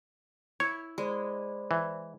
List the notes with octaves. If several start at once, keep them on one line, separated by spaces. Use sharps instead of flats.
E4 C#5
G#3 C5 D5 B5
E3